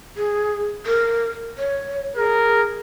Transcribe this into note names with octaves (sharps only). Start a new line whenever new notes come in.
G#4
A#4
C#5
G#4 A#4